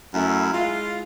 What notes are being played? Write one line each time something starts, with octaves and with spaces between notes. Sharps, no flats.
F#2 A3 E4
G#3 E4 F4